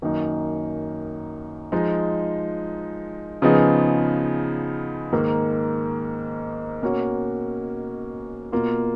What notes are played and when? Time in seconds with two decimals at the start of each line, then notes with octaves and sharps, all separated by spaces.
0.02 F#2 D#3 A#3 D#4
1.72 F3 G#3 D#4
3.42 C#3 F3 B3 D#4 G#4
5.12 G#2 D#3 A#3
6.82 B2 A#3 C#4 F#4
8.52 B2 A#3 F4